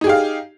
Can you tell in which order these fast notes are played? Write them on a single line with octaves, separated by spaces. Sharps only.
D#4 G#4 G4 F5